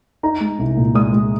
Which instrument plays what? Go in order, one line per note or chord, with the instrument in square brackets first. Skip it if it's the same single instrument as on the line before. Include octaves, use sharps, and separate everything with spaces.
[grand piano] D#4 A#5
G#3
C2
A#2
G#3 D#6
G#3